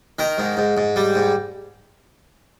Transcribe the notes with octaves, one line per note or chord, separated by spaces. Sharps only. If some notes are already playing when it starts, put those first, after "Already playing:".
D#3 A#4
G#2
G#2
G#2
G3
G#2